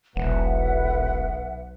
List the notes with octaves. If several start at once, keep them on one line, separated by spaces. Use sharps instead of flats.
E1 B1 B4 E5 F#5